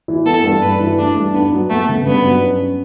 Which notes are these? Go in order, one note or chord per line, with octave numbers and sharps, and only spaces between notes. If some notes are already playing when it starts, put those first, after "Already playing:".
E3
B3 A4
G2
G2 B4
E3
A3 D4
G2
B3 D4
F#3
A3 B3
C#3
G2 B3
F#3
C#4